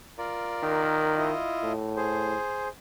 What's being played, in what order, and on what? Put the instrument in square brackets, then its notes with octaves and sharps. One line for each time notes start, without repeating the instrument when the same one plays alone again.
[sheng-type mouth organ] F4 A#4 D5
[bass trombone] D#3
[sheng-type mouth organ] E4 F4 D#5
[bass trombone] A2
[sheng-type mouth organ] G#4 C5